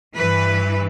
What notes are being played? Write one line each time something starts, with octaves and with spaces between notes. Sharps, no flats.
G2 E3 B4